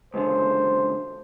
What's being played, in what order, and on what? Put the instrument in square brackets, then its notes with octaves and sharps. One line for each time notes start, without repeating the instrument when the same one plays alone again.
[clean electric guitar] C#2 F#2 D3 [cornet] C5